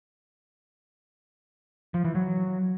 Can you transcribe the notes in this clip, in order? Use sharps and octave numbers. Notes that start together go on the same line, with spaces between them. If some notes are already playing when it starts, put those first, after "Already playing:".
F3
E3
F#3